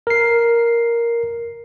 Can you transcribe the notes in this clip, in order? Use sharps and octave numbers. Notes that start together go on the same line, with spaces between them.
A#4 C7